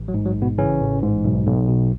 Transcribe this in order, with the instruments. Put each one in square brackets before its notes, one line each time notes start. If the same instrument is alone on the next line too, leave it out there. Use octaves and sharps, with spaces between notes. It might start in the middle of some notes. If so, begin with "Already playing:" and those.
Already playing: [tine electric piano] A1
F#3
G#2
F#3
A1
B2 B3
C#3 E3 C#4
A1
G#2
B1
B1
B2